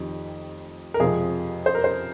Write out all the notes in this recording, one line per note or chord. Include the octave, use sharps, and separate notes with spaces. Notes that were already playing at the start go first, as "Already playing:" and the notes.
Already playing: F1 F2 D#3 G4
A#4
F2 C3 F3 G#3 G#4
C5
A#4
C5